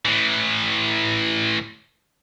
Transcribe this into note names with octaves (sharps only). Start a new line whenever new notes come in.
A2 E3